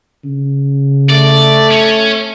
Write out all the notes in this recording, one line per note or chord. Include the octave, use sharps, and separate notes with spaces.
C#3
A3 D5
C#4